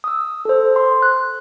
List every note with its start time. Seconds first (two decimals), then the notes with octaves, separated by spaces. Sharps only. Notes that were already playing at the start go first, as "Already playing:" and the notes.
0.04 D#6 E6
0.45 A4 C5
0.76 C6
1.02 F#6